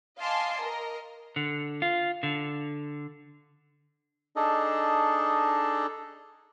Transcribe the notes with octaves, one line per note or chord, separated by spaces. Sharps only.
D#5 F5 G#5 A5 C6 D6
A#4 D#5
D3
F4
D3
D4 D#4 G#4 A4 D#5